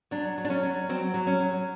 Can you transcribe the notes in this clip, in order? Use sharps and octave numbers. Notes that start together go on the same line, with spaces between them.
F#3 D4
F#3
D4
C#4
F#3
F#3 C4
F#3
C#4
F#3